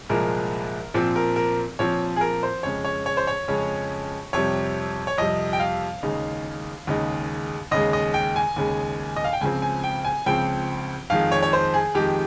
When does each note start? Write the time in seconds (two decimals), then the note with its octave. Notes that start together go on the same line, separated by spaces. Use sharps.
0.10 C2 A#2 F3 G#3 A#4
0.94 A#2 F3 C4
1.16 A#4
1.36 A#4
1.79 A#2 F3 C4 C#5
2.16 G#4
2.21 A#4
2.43 C5
2.63 F2 C#3 G#3 C#4 C#5
2.85 C#5
3.06 C#5
3.17 C5
3.27 C#5
3.48 F2 C#3 G#3 C#4
4.33 F2 C3 G3 C#5
5.07 C#5
5.18 F2 C3 G3 D#5
5.53 G5
5.60 F5
6.03 D#2 C#3 G#3 D#4
6.87 D#2 C#3 G#3 D#4
7.71 D#2 C#3 G#3 D#5
7.93 D#5
8.14 G5
8.36 G#5
8.56 D#2 C#3 G#3
9.16 D#5
9.24 F5
9.33 G5
9.41 C#2 C#3 F3 C4 G#5
9.62 G#5
9.84 G5
10.05 G#5
10.26 C#2 C#3 F3 C4 G5
11.10 F2 D#3 G#3 F5
11.32 C#5
11.43 C#5
11.53 C5
11.74 G#4
11.95 F2 D#3 G#3 G4